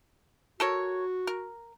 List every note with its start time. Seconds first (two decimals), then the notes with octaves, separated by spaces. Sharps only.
0.60 F#4 A4 A#4 C#5
1.27 A#4